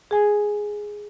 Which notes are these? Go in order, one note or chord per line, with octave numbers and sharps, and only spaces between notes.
G#4 G#5